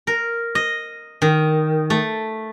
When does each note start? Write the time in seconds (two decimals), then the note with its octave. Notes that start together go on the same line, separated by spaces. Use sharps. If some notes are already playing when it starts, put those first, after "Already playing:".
0.07 A#4
0.55 D#5
1.22 D#3
1.90 A3